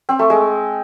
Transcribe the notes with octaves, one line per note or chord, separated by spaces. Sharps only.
C4
A3
G#3